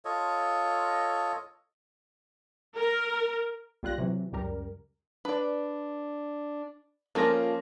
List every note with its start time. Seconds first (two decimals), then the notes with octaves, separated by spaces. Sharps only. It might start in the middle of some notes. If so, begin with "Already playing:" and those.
0.05 F4 A4 C#5 D#5
2.76 A#4
3.83 B1 G3 F4 F#6 A#6
3.98 C3 E3 F#3
4.32 C#2 F#2 G3 A#4
5.25 D4 B4 D5
7.15 F3 A#3 C#4 F4 A4 A#6